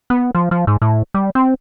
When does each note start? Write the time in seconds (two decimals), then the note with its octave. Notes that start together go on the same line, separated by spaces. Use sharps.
0.10 B3
0.35 F3
0.51 F3
0.67 G#2
0.82 A2
1.14 G3
1.35 C4